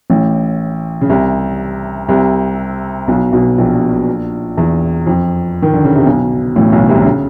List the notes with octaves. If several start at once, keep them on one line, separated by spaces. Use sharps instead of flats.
A1 A2
C#3
C2 C3
C2 C3
B1 B2
B1 B2
A#1 A#2
E2
F2
D#3
D3
C#3
C3
B1 B2
A1 A2
B1 B2
C2 C3
D3
C#3